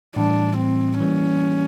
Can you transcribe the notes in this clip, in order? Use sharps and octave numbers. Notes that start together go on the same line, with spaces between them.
A2 E3 G3 D4
C4
E3 G3 A#3 C#4